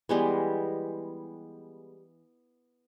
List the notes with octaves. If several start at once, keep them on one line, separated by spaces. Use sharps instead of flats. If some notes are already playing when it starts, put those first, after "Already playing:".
E3 G3 G#3 B3